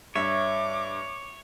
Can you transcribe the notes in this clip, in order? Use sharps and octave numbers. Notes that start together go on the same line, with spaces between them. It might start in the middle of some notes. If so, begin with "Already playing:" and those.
G2 C#5 E5 D6